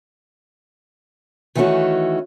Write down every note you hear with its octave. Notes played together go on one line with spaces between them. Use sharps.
D#3 E3 A3 B3 C#4 F#4